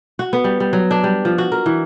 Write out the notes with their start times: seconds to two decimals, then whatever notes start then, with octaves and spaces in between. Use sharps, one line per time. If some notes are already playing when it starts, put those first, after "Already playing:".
0.19 F#4
0.33 B3
0.44 G3
0.60 G3
0.73 F#3
0.91 D4
1.04 G3
1.25 F3
1.38 F#4
1.52 A#4
1.66 E3